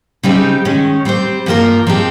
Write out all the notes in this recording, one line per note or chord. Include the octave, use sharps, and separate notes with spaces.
C#3 G3 C4 D#4 G4
D#3 G#3 C#4
G3 C4 G4 C5
G2 F3 A#3 F4 A#4
F3 G#3 C4 G4